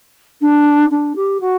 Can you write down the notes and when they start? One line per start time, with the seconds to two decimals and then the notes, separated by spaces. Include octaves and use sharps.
0.41 D4
0.90 D4
1.15 G4
1.40 F#4